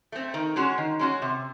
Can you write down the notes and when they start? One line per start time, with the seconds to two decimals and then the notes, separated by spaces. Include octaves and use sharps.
0.12 A3 C4
0.34 D#3
0.56 G#3 C#4 F#4
0.78 D#3
0.99 G#3 C#4 F#4
1.22 C3